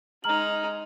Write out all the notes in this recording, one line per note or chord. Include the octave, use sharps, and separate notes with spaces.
G#3 D#4 A#5 F6 F#7